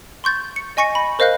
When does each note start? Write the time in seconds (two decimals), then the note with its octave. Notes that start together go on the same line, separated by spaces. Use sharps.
0.24 C6 C#6 G6 A6
0.56 C#7
0.77 D#5 G#5 C#6 A#6 C#7
0.95 B5
1.19 A#4 C5 D#5 F5 F#6 G6